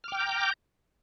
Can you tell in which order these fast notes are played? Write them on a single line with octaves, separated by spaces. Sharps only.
F6 D6 G5 G6 A#5